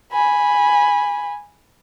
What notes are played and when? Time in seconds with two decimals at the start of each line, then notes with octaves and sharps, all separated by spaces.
0.12 G#5 B5